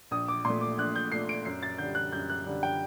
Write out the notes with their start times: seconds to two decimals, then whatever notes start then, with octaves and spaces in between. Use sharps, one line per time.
0.11 A#1 D#6
0.28 D6
0.45 A#2 A3 C6
0.61 D6
0.78 A#1 F#6
0.96 G6
1.12 A#2 A3 C7
1.29 D7
1.45 F#2 C7
1.63 A6
1.78 D3 G3 G6
1.95 F#6
2.12 F#2 G6
2.30 F#6
2.46 D3 G3
2.63 G5